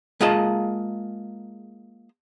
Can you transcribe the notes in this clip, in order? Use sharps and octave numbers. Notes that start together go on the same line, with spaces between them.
G#3 A#3 F4 G#4 D#5 A5